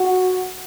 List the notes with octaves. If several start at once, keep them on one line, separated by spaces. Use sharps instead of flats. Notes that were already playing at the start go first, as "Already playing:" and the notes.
Already playing: F#4